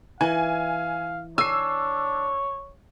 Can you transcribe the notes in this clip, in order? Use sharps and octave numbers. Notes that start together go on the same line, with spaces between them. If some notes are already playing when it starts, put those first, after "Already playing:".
E3 F5 G#5
D4 C#5 G#5 E6 C7